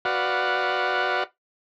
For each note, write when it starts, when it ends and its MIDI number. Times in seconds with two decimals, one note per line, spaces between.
0.05 1.24 66
0.05 1.24 71
0.05 1.24 74
0.05 1.24 77
0.05 1.24 78